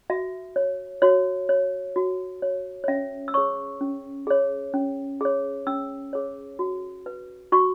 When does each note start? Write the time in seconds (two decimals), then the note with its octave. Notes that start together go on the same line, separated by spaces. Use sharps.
0.10 F#4 E5
0.56 C#5
1.02 F#4 C#5
1.49 C#5
1.96 F#4
2.42 C#5
2.84 C#5
2.88 C#4 E5
3.28 E6
3.34 G#4 C#5 C#6
3.81 C#4
4.27 G#4 C#5
4.74 C#4
5.21 G#4 C#5
5.67 C#4 E6
6.13 G#4 C#5
6.59 F#4
7.06 B4
7.52 F#4 C#6